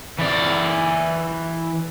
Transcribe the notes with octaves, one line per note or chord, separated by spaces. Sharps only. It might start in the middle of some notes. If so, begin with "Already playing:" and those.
E3 D5